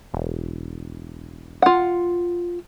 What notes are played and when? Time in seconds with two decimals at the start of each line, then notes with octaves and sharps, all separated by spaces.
0.14 E1
1.62 F4 F#5